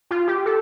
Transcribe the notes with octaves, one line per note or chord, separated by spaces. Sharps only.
F4
G4
A4